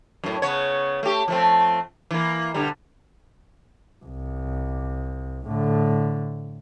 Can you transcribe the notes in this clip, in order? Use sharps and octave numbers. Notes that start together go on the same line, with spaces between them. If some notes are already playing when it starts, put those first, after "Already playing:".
F#2 A2
C#3 B3 C#5
A3 G4
F3 A3 C4
E3 A#3
B2 D3 G3
C2
A2 D3